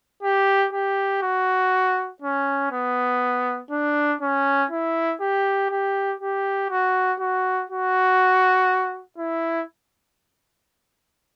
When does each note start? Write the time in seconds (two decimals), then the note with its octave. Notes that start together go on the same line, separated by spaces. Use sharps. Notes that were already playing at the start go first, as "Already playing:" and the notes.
0.22 G4
0.73 G4
1.22 F#4
2.22 C#4
2.71 B3
3.70 D4
4.21 C#4
4.71 E4
5.20 G4
5.70 G4
6.20 G4
6.69 F#4
7.20 F#4
7.69 F#4
9.18 E4